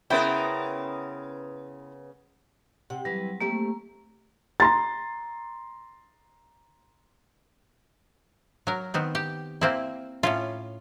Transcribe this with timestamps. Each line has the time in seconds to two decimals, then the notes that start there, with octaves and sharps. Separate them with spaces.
0.10 C#3 B3 E4 A#4 C5 G5
2.90 C3 F#5
3.05 E3 F#3 G3
3.41 A3 A#3 C4 G4
4.60 A#5 C6 A6
8.67 F#3 A#4
8.94 D#3 B3 C4
9.15 G4
9.61 A#3 C4 E4
10.23 A2 C#4 F4